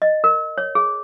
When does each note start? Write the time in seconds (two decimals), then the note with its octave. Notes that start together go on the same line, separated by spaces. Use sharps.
0.02 D#5
0.24 A#4
0.58 C#5
0.75 G#4